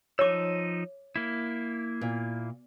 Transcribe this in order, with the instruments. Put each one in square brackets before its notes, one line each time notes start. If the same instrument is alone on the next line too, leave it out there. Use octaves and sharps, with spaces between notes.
[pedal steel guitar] F3 D#4 E6 [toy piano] C#5 D6
[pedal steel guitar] A#3 E4
[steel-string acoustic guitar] A#2